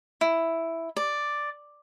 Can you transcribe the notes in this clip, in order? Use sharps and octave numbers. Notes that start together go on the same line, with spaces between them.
E4
D5